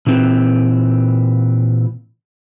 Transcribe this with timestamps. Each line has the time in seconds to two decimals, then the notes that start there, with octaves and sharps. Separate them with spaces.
0.07 A#2 E3 C4